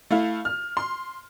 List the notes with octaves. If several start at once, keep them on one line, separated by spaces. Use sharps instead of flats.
A3 E4 F5
F6
C6